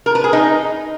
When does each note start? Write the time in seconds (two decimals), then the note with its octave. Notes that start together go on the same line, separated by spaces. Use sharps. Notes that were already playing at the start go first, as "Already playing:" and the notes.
0.06 A#4
0.15 B4
0.24 G#4
0.33 D#4